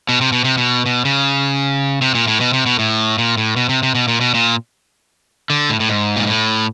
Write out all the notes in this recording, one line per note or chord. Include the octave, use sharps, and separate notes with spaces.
B2
C3
B2
C3
B2
B2
C#3
C3
A#2
A2
B2
C3
B2
A2
A#2
A2
B2
C3
C3
B2
A#2
B2
A#2
D3
A2
A2
G#2
A#2
A2